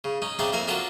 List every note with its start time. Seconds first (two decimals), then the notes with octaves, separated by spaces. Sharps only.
0.04 C#3
0.22 C#4 D#4
0.39 C#3 C4 D4 D#4 D5 E5
0.53 F2 A#3 E5 G#5 A#5
0.68 C#4 D4 F4 F#4 A4 A#4